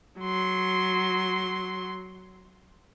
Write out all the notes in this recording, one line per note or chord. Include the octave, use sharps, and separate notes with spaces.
F#3 C6